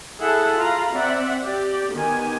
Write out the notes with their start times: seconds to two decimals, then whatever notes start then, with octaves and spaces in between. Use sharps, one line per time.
0.19 E4 G#4 A4 E5 F#5 A5
0.57 F4 F5 A#5 B5
0.93 C4 D5 E5 F#5
1.43 G4 D5
1.93 D#3 B3 G4 G#5